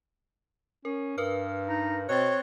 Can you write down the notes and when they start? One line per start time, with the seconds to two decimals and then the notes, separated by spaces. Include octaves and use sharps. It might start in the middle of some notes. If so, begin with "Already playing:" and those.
0.85 C#4 A#4
1.18 G2 A#4 B4 F6
1.68 D#4
2.09 B2 C4 C#5 F#6 A6